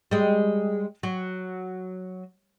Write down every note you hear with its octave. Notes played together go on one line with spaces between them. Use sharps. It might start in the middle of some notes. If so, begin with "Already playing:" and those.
G3 G#3
F#3